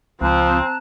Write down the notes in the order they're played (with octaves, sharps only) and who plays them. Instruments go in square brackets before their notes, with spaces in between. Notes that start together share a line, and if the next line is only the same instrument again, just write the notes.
[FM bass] C#2 [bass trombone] F3 [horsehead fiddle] C4 [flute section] A5 A#5 F#6